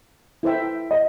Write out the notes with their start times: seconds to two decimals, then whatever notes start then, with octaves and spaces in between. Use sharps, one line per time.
0.43 E4 A4 C5 E5 G5
0.91 D#5